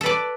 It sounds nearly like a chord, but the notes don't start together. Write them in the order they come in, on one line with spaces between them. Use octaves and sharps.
A4 B4 D5